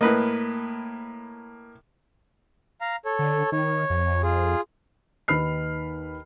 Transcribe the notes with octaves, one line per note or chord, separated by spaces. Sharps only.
A2 A#3 B4 D#5
F5 A#5
A4 C#5
D3
D#3 C#5
F2
F4 G#4
D#2 D#3 B4 B5 F6 C7